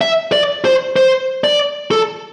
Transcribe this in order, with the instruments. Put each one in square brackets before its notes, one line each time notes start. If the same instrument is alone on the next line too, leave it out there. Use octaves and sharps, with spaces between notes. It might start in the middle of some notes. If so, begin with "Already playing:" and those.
[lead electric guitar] E5
D5
C5
C5
D5
A4